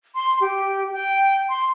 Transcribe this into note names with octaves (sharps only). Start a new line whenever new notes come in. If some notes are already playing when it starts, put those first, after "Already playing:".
C6
G4
G5
C6